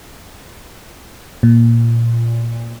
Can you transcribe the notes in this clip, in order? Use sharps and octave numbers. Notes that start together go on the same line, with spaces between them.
A#2